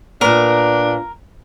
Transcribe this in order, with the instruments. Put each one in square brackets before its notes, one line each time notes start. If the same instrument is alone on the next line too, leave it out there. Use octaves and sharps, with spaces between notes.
[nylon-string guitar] A#2 B3 [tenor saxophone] D4 [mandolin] A#4